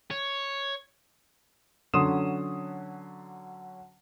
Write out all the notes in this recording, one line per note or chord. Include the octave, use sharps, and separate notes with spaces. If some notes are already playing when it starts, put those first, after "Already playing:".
C#5
D3 F#3 C#4 C6 D#6 E7